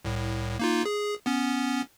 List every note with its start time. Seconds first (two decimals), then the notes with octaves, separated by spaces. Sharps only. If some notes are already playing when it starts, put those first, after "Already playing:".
0.05 C2 A2
0.59 A#3 D#4 F4
0.86 G#4
1.26 B3 C#4